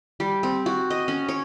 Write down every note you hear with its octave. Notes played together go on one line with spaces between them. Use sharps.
G3
C4
F#4
D#5
C#4
C#5